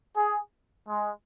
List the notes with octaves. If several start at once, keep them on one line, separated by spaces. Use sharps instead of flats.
G#4
G#3